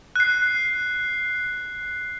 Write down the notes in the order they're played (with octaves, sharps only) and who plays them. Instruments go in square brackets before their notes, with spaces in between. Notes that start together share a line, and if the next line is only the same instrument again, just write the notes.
[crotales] F#6 C7